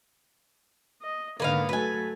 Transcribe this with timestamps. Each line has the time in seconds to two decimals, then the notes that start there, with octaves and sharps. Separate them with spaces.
1.01 D#5
1.40 G#2 D3 D#3 A#3 B3 F5
1.69 F#3 A3 A4 B4 G#5